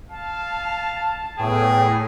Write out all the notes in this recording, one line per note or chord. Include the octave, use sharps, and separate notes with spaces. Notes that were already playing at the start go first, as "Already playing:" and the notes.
F5 A5
E2 A2 B3 G#4 G5